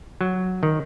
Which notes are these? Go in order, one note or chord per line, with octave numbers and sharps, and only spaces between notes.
F#3
D#3